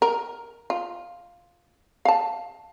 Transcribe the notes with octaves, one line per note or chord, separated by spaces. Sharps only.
A#4
F4
F5 A5